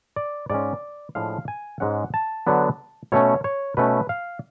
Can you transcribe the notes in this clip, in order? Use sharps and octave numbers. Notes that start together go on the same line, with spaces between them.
D5
G#2 G#3 C#4 D5
A2 F3 G#3 D4 F5
G#5
G#2 G#3 C#4 F#5
A5
D3 F#3 B3 D4
B2 A3 C#4 C#5
C#5
B2 A3 C#4 B4
F5